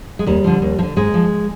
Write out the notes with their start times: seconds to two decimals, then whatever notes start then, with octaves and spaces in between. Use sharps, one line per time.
0.19 G#3
0.26 D#2 G3
0.44 D3 F3
0.62 D#2
0.79 F3
0.83 D3
0.96 G#2 G#3
1.14 F3